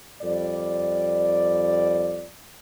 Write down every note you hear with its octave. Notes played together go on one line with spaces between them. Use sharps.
F2 G3 D5